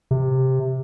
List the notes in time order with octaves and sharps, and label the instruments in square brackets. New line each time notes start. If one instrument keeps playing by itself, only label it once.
[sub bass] C3